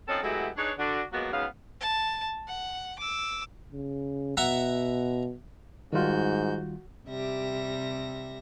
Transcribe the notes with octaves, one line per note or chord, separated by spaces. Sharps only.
F3 C4 C#4 D#4 A4
F#3 G#3 A3 B3 E4 G4
D4 D#4 G#4 B4 C#5
D3 D4 F#4
F3 F#3 G#3 A#3 B3 F#4
G#2 C#3 F#3 B3 F5
A5
F#5
D6 E6
C#3
B2 E5 F#5 A#5
G#2 D#3 G3 F4 F#4 G6
C3 G3 E5 A#6